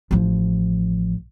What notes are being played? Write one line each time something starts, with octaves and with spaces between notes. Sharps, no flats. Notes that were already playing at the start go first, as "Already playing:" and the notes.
A1 F3